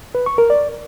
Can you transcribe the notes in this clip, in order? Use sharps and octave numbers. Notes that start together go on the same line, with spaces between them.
B4
C#6
A#4
D5